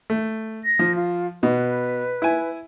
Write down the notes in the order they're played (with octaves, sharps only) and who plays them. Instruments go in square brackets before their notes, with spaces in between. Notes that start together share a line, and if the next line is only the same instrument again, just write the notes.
[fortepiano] A3
[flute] A#6
[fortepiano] F3
[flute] F4
[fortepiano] B2 [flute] B4
[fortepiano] E4 G#5